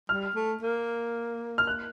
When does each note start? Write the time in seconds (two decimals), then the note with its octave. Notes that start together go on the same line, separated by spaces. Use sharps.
0.09 G3 F6
0.35 A3
0.62 A#3
1.58 F6
1.67 F#6